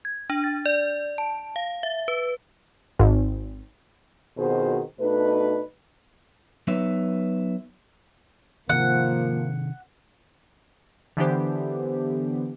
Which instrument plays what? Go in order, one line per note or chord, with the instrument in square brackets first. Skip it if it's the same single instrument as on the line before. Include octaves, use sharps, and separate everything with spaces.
[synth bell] G#6
D4
A6
D5
A5
F5
E5
B4
[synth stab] G#1
[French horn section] F2 B2 D#3 F#4 G#4 C5
B2 A3 D4 D#4 B4
[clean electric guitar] F#3 B3 D#4 B4 C#5 E5
[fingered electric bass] C3 D#3 [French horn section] F3 A#3 [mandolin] F#5
[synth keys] D3 E3 B3 D4 G4 C5